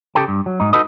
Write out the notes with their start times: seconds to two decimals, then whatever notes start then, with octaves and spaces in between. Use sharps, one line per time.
0.15 C#3 F4 G4 A4 G5 A5
0.28 G2
0.46 F#3
0.60 G#2 D#4
0.73 D#4 F#4 A4 B4 D#5